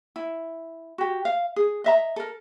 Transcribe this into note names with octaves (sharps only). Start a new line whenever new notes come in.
E4
F#4 G4
F5
G#4
D#5 E5 A#5
A4 A#4